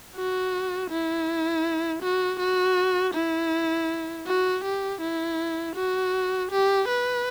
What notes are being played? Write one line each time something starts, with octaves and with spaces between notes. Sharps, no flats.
F#4
E4
F#4
F#4
E4
F#4
G4
E4
F#4
G4
B4